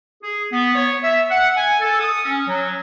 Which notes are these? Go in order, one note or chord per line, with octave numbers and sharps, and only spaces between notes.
G#4
B3
C#5
E5
F#5
G#5
A4
D#6
C#4
F#3